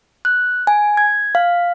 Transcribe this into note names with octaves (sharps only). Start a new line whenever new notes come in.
F#6
G#5
G#6
F5